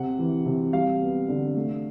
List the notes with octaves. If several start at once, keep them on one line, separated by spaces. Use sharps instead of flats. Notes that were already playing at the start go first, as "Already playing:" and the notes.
Already playing: C3 F#5
E3
C3
G3 F5
B3
D3
A3